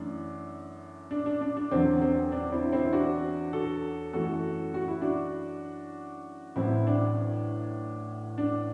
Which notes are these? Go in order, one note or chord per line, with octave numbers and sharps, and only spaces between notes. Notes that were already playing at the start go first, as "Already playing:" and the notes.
Already playing: F#2 E3 A3 D4
D4
D4
D4
D4
E2 D3 F#3 C4
C4
D4
C4 E4
C4 E4
D4 F#4
F#4 A4
F#2 E3 A3 F#4 A4
F#4
E4
D4 F#4
A1 A2 F#3 C4 E4
D4
D4